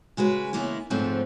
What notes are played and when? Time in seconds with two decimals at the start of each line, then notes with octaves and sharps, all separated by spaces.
0.17 C#3 G#3 F#4 B4
0.53 C#3 E3 G#3 A#3 B3 E4
0.90 G#2 C#3 F3 A3 C4 B4